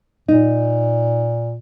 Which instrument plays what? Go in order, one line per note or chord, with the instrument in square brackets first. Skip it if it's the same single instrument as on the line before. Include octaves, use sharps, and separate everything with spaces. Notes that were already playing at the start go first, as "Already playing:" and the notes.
[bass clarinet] A#2 [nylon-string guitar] D#4